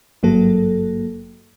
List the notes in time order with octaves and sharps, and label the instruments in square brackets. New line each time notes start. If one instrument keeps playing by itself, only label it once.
[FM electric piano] G#1 G2 F#3 A#3 A4